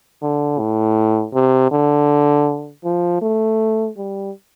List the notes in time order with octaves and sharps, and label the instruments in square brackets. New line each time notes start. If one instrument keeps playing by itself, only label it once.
[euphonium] D3
A2
C3
D3
F3
A3
G3